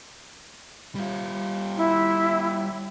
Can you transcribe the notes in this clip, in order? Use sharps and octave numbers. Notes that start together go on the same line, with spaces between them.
G3 F4
E4